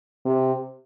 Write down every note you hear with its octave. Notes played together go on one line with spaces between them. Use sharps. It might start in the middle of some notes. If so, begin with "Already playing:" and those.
C3